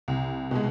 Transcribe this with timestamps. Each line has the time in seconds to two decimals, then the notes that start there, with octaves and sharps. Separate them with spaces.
0.08 C2
0.51 B2 G#3